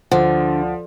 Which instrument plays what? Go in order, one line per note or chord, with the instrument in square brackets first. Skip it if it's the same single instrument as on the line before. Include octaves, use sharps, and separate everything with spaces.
[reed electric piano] D2 C5 F#5 [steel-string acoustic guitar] D3 [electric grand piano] F3